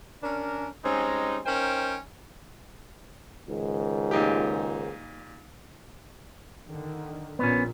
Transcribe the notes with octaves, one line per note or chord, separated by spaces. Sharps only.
C#4 D4 A#4
G3 G#3 C4 C#4 D#4
C#4 D#4 A#4 C5 G5
C#2 G#2 D#3
A#2 D#4 G4
D3 D#3
A#1 A#2 B3 C#4